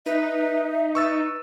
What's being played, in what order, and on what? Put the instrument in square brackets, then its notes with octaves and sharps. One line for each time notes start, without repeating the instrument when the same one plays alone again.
[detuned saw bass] D#4 [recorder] B4 [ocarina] E5
[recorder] B4 [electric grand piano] C#6 E6 A6